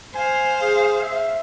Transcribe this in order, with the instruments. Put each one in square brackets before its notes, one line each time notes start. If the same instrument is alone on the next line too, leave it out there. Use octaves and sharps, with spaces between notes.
[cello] C5 F5 [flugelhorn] G#5
[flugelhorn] G#4
E5